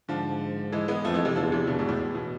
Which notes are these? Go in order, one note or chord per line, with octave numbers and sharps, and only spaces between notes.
G#2 D3 F3
E3 G#3
G#3 B3
F2 F3 A3
E3 G#3
C3 E3
E2 D3 F3
D3
C3 E3
B2 D3
G#2 B2
A2
A2
B2